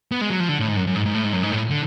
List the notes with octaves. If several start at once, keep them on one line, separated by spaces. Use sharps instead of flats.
B3
G#3
F#3
F3
D3
A2
G#2
F#2
F#2
G#2
G#2
A2
G#2
F#2
G#2
A2
D3